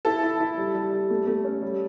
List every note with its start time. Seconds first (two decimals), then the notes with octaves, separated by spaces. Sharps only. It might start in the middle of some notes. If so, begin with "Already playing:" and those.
0.05 E4 A4
0.23 E4
0.40 E4
0.58 G3
0.75 G3
0.93 G3
1.10 A3
1.27 A3
1.44 C#4
1.62 G3